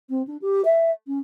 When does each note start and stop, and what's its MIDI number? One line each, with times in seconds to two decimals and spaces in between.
0.09 0.22 60
0.27 0.37 62
0.41 0.61 67
0.64 0.90 76
1.07 1.18 61